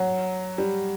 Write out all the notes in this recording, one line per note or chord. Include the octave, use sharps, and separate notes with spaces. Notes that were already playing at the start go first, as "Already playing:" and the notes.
Already playing: F#3
G3